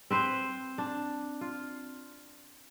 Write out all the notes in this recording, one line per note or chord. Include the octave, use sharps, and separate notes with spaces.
C4 B4 C5
D4
F4